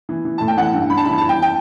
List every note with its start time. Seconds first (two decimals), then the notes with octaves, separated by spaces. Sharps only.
0.09 E3
0.25 E3
0.38 A2 A5
0.48 G5
0.57 E3 F#5
0.73 G2
0.89 G2 B5
0.97 A5
1.05 E3 B5
1.18 A5
1.22 E3
1.29 G5
1.42 G5